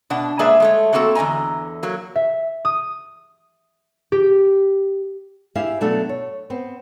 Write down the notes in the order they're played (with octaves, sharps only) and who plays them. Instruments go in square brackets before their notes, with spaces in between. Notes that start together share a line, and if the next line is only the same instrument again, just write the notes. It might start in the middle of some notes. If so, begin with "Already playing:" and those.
[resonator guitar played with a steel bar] B2 D4 F#5
G#3 A#3 G#4 B4 D5 E5
G#3 A3 C#5
A3 A#3 C4 F#4 A4
E2 D3 D#5 G#5 A#5
F#3 A#3
[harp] E5
D#6
G4
[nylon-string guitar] E4 G4 G#4 E5 F5
B2 F#3 A3 D4 E4 A4
C#5
B3 C4